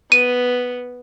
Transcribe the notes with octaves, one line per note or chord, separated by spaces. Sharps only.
B3 D#7